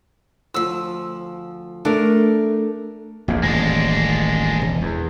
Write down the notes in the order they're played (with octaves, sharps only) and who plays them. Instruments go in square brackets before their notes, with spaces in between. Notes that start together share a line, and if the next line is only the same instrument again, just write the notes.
[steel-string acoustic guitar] D2 F3 [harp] E6
[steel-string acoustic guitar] A3 [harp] D4 A#4
[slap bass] A#1 E2 A#2
[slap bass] D#1 A1 [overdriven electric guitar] G#3 D4
[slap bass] E1
E2